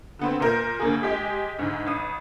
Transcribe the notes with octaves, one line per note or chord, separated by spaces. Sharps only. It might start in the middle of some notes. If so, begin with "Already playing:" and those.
D3 B3 C4
A#2 A#4 G6
D2 A#3 G#4
G#3 G4 G#4
D2 G#2
A1 D#6